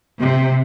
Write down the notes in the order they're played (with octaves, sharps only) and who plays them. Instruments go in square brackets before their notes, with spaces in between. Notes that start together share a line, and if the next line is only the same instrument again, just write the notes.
[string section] C3